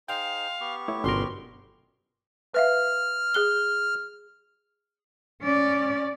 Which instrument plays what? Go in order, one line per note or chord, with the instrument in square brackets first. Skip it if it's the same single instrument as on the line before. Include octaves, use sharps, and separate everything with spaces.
[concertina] D#4 G#4 C5 [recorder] F5 [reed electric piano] G5
[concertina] B3 G4 C#6
[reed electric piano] A3 E4 C#5
[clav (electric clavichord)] G1 A#4 [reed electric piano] B2 F#3 C#4 [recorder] C6
[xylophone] B4 E5 F5 [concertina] F6
[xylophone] G#4 F#6 G7
[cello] C#4 D5